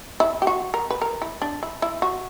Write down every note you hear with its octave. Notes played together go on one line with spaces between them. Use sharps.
E4
G4
F#4
A#4
B4
A#4
E4
D4
E4
E4
F#4